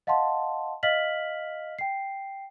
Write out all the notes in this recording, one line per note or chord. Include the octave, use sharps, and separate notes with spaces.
D#5 F5 F#5 A5 C6
D#5 F5 F6 B6 F#7
G5 C7